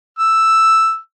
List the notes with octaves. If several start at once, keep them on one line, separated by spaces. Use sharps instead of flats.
E6